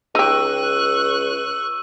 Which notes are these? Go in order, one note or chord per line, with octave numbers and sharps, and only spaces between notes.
C#2 D#4 G4 C#6 E6 F#6 D#7